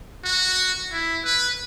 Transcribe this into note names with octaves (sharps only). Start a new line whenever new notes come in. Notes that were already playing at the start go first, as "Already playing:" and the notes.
F#4
E4
B4